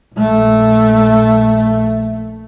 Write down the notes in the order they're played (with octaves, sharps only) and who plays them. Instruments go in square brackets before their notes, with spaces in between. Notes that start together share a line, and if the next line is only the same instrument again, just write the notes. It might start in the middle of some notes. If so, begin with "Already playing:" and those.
[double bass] A#1 A3